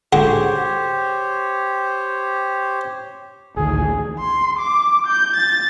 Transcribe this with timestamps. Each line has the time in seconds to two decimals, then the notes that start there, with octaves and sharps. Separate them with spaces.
0.13 D3 G#3 F#4 G4 C5 C#5
3.57 A1 D2 D#3 G#4
4.19 C6
4.59 D6
5.07 G6
5.36 A6